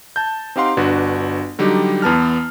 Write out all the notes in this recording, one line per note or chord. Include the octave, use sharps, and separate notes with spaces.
A5 G6
C4 D#4 G4 F5 F#5 C6
G1 D4 F#4 B4
D3 F#3 G3 D#4 G4
E2 B3 A5 F6